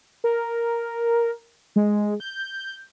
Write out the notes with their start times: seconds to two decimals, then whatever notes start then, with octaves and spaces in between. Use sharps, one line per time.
0.24 A#4
1.76 G#3
2.20 G6